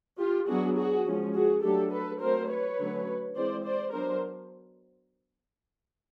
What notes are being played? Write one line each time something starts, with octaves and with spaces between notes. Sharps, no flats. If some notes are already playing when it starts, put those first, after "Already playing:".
F4 G4
F#3 B3 D4 F#4 G#4
F#4 G#4
F3 G#3 C#4
F#4 G#4
F#3 A3 D4 G4 A4
A4 B4
F#3 A3 C4 A#4 C5
B4 C#5
D3 F#3 A3 C#4
E3 G#3 C4 C5 D5
C5 D5
F#3 B3 D4 A#4 C5